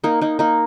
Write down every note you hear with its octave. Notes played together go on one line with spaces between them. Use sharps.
A#3 D#4
A#3 D#4
A#3 D#4